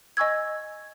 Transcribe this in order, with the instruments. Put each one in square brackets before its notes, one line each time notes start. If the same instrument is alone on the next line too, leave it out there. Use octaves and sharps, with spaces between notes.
[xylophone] D#5 G#5 C#6 E6 G#6